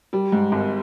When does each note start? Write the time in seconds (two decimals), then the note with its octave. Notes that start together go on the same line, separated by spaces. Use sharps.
0.13 G3
0.32 G#2
0.52 G#1